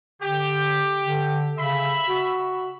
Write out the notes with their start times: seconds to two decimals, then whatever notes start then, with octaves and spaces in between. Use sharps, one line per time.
0.22 D3 G4
1.03 D3
1.58 C#3 E5 B5
2.09 F#4